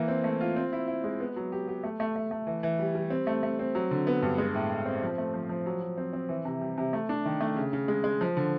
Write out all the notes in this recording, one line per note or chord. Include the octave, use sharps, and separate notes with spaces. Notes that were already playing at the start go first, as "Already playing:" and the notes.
Already playing: E3 A#3
C4
A3
F4
C4
E4
E4
G#3
B3
F#3
G4
G4
A3
A3
A3
A3
E3
E3
G3
G3
C4
A3
A3
C4
F#3
D3
B3
G2
G#3
A2
A2
C4
F3
A3
F3
F3
F#3
F#3
C4
C4
E3
C3
G3
C3
A3
D4
D#3
A3
C#3
C#3
G#3
G#3
F3
D3